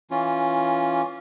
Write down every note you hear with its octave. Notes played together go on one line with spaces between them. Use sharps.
E3 C#4 F4